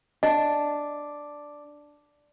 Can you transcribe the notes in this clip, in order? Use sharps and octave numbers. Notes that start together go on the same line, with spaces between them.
D4 D#5